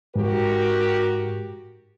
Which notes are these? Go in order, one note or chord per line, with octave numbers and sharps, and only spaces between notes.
G#2 F#4 G4 A#4